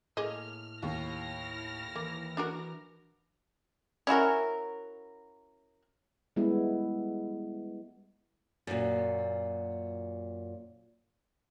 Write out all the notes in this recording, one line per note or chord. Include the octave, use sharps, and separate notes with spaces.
A2 A#3 G#4 D#5 F6
D#2 E4 F6 A#6
E3 A#3
D4 F#4 A#4
C#4 E4 F#4 A#4
G3 G#3 B3 C#4 E4
F#2 A#2